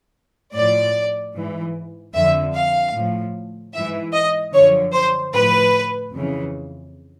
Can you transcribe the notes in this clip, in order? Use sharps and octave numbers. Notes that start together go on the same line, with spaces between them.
A2 F3 D5
G#2 E3
F2 D3 F3 E5
F5
A2 F3
G#2 E3 E5
D#5
F#2 D3 F3 C#5
C5
A2 F3 B4
F2 C#3 E3